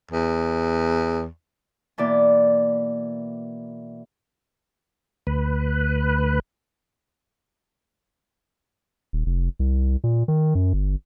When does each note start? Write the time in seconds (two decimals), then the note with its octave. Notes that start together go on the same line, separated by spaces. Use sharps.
0.11 E2
1.98 B2 E3 A#3 D5
5.27 D2 B4
9.13 D#1
9.26 F1
9.60 C2
10.04 A#2
10.28 D#3
10.55 F#2
10.73 G1